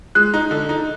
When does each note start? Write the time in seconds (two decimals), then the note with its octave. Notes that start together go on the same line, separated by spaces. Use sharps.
0.15 G#3 F#6
0.34 D#4
0.51 D3
0.69 D#4